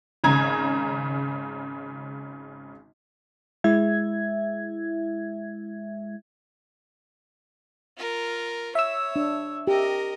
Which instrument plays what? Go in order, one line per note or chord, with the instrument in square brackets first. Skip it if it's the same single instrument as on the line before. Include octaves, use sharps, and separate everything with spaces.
[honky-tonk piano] G#1 C#3 A#5 G#6
[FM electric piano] G#3 E4 E5 G#6
[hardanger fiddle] F4 A#4
[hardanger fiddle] C#5 [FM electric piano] E5 E6
[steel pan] D4
[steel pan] G4 [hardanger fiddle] A#4 D#5